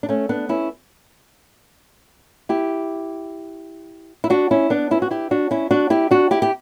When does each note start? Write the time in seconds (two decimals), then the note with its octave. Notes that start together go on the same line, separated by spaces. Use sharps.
0.03 D4
0.09 A3 C#4
0.29 B3 D4
0.49 C#4 E4
2.49 E4 G4
4.24 E4
4.30 D4 F#4
4.51 C#4 E4
4.70 B3 D4
4.91 C#4 E4
5.02 F#4
5.11 E4 G4
5.31 D4 F#4
5.51 C#4 E4
5.71 D4 F#4
5.90 E4 G4
6.11 D4 F#4
6.31 E4 G4
6.42 G4